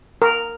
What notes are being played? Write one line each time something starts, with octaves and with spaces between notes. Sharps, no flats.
A#4